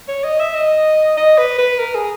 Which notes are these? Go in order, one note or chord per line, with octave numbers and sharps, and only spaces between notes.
C#5
D#5
E5
D#5
D#5
B4
B4
A#4
G#4